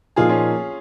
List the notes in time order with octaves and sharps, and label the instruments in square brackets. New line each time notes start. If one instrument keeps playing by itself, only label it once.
[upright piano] A#2 F3 A#3 D#4 [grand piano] F4 G#4
[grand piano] C#4 F4